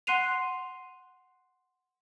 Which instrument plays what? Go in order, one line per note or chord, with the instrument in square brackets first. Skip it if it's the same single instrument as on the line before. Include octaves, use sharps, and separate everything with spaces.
[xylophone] F#5 C6 F#6 C7 D#7 F7